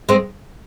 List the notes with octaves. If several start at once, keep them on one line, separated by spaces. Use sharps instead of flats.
G#3 C4